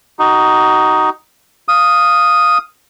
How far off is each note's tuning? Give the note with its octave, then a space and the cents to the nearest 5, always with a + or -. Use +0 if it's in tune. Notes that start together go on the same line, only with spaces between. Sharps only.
D#4 +0 F#4 +30
F5 +0 D#6 +0